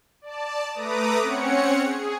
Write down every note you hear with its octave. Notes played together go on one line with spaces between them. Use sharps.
D5 A5
A3 B4 A#5 D6 D#6
C4 C#4 C#5 F#5 C#7
G#4